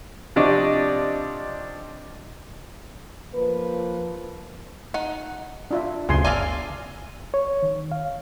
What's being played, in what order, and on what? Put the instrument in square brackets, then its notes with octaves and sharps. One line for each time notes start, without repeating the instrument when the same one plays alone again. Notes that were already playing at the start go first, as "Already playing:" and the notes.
[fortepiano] C3 F3 D4 D5 D#5 C#6
[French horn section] F3 A#3 B4
[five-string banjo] D#4 F#5
[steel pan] D4 F4 E5
[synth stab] D2 G2 C#3 [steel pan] G#5 C6
[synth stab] G1 G#5 [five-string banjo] F4 A4 F5 [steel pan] D5 A#5
[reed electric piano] C#5
D#3
F5